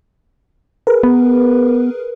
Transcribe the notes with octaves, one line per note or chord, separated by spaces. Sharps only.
G#4 A#4 B4
B3